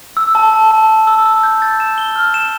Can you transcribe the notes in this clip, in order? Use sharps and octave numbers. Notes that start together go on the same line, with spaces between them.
E6
A5
A5
A5
A5
E6
E6
G6
A6
E7
G7
F6
E7